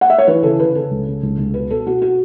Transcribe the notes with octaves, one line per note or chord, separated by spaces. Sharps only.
F#5
E5
C#5
E3 B4
C#3 A4
C#3 B4
C#3 A4
C#2
C#3
C#2
C#2
B2 B4
B2 A4
B2 F#4
F#4